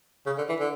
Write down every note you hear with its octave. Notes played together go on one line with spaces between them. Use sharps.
C#3
D3
E3
D3